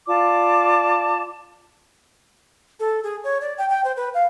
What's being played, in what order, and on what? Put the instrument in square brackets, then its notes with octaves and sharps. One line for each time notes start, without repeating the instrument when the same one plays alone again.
[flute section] F4 D5 A5 D6
[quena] A4
G#4
C#5
D5
G5
G5
C5
B4
F5